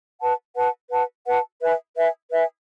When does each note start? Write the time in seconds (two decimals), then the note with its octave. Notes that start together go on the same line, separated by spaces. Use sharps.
0.20 B4 F#5 A5
0.56 B4 F#5 A5
0.91 B4 F#5 A5
1.26 B4 F#5 A5
1.61 B4 E5 G#5
1.96 B4 E5 G#5
2.31 B4 E5 G#5